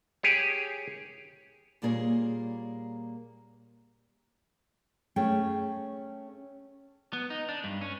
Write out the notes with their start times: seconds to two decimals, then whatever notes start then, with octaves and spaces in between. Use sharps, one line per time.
0.23 G4 G#4 C#5
1.82 A#2 G3 A#3 G#4 B4 C#5
5.16 A3 C#4 G#4 G5
7.13 B3
7.30 D#4
7.49 D4
7.64 G2
7.81 C#4